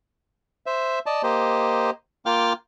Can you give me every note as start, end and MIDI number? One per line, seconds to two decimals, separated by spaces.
0.66 0.99 72
0.66 0.99 76
1.06 1.22 74
1.06 1.22 75
1.06 1.22 81
1.23 1.90 58
1.23 1.90 67
1.23 1.90 72
1.23 1.90 75
2.26 2.53 58
2.26 2.53 65
2.26 2.53 77
2.26 2.53 79
2.26 2.53 86
2.26 2.53 89